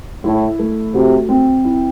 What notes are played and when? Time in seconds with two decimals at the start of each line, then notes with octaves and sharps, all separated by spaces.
0.24 A2 E4
0.59 A3
0.94 C3 F#4
1.29 C4
1.64 E4